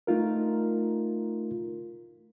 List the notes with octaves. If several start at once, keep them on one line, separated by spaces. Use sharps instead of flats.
A3 D#4 F4 A#4